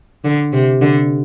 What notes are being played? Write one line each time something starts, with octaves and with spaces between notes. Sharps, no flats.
D3
C3
D3